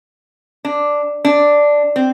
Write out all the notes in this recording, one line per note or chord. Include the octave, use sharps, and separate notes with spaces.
D4
D4
C4